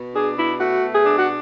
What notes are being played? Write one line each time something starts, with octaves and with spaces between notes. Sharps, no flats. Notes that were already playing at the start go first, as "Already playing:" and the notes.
Already playing: B2
D4 G#4
B2 E4
A3 F#4
B2
G#4
D4
F#4